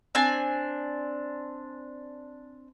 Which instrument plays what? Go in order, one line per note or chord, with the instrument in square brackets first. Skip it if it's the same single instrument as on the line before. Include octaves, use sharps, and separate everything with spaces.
[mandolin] C4 D4 G#5